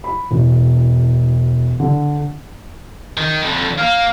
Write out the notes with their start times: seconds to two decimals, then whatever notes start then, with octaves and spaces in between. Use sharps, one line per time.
0.04 B5
0.31 E1
1.80 D3
3.17 D#3
3.41 F2 D3
3.78 A#3 F5